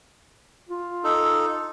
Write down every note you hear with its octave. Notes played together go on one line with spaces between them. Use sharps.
F4
D#4 A4